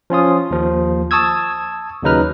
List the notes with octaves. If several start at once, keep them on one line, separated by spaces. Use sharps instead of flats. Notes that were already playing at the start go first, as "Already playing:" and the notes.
F3 C#4 F4 D#6
D#2 F3
A5 C#6 D#6 E6 G#6
D#2 C#3 F#3 D#4 B4 F6